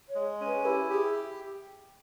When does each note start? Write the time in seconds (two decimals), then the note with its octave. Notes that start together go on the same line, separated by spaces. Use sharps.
0.09 C#5
0.15 G#3
0.40 C#4
0.46 B4
0.65 E4 G4
0.90 G4 G#4